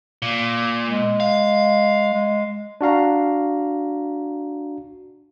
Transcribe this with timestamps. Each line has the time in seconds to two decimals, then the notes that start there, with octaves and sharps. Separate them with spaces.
0.22 A#2
0.86 G#3
1.20 F5
2.14 G#3
2.81 D4 F#4 F5 A#5